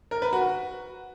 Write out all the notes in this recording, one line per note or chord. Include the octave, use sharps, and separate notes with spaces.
A#4
B4
F#4